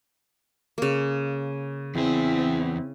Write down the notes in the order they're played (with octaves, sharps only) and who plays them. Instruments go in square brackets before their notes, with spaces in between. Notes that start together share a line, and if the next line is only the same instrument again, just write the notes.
[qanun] C#3 A#3
[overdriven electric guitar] E2 G#4 [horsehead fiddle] C4 E4